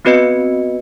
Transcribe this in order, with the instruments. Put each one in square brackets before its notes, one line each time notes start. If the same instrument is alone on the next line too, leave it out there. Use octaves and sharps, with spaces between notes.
[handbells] B3 C4 F#4 B4 D#5 C#7